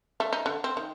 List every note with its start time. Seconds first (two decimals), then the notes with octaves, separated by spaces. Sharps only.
0.20 A3
0.33 D#4
0.46 D3
0.64 C4
0.77 D#3